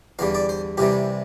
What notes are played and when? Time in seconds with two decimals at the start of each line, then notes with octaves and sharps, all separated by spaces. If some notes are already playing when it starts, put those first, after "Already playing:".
0.19 E2 D3 G3 F5
0.35 D5
0.49 C5
0.78 C2 C3 E3 G3 G4